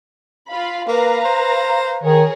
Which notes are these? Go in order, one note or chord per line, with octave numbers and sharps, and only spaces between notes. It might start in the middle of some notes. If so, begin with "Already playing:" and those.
F4 F5 B5
A#3 B4 F5 A#5
C5
D#3 G#4 A#4 C#5